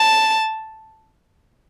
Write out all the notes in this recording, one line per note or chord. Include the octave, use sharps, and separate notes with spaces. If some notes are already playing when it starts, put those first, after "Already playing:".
Already playing: A5